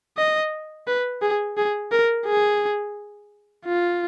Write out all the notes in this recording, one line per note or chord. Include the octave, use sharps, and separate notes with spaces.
D#5
B4
G#4
G#4
A#4
G#4
F4